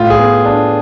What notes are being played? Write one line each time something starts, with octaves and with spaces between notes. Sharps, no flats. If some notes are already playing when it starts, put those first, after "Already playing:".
Already playing: A2 F4
G#4
B3
D4